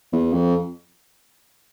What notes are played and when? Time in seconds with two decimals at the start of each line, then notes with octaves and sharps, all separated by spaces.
0.12 E2
0.33 F2